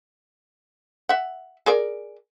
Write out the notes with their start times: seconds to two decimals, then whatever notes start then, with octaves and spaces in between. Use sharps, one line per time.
1.09 E5 F#5
1.66 G#4 A#4 D5